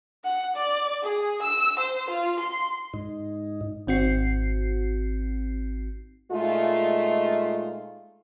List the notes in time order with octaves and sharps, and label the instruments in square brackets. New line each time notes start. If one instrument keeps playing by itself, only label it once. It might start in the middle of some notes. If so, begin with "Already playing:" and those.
[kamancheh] F#5
D5
G#4
E6
C5
F4
C6
[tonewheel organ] G#2 D#4
[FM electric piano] G#1 C4 F#4 C7
[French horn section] A#2 G#3 A3 D#4 F4